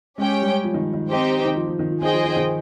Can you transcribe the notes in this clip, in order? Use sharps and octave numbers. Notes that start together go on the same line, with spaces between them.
G#3 C#4 G4 C#5 G5
G3
F3
D#3
D#3
C4 D#4 G4 C5 G5
D#3
F3
F3
D#3
F3
D#3 G#4 C5 D#5 G5
F3
D#3
D#3